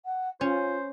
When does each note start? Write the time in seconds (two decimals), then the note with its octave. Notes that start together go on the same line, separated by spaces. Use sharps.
0.05 F#5
0.41 C#4 F4 C5